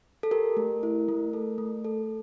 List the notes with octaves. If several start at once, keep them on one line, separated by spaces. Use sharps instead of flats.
A4
G4 A#4
A3
E4
A3
A4
A3
A4